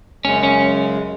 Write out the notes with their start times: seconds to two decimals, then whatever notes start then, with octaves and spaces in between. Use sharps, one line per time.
0.24 F#2 C#3 G#3 C#4
0.43 C#4